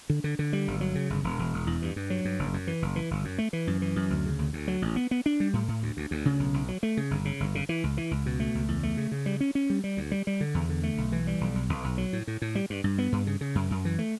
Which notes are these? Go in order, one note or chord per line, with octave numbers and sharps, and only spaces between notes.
D3
D3
D3
G3
G1
F#3
C#3
G1
E1
E1
E1
E2
G2
G2
F#3
G2
F#1
F#2
E3
F#1
E3
G1
F#2
A3
E3
F#2
E3
F#2
D2
C#3
D2
D2
F#3
A1
B3
B3
D4
G3
A2
A2
D2
D2
D2
C#3
B1
B1
F#3
A3
C#3
G1
C#3
G1
C#3
E3
C#2
E3
C#2
B2
A3
C#2
E2
A3
C#3
C#3
G3
C#4
C#4
G3
G3
D2
G3
G3
D3
E2
D3
A3
B1
E3
G3
B1
B1
B1
B1
F#3
A2
A2
A2
G3
G2
G2
B3
G2
C#3
C#3
F#2
F#2
E3
A3